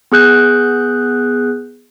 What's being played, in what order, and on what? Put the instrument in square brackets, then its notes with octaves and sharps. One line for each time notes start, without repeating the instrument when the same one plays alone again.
[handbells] B3 G#4 F#6 G6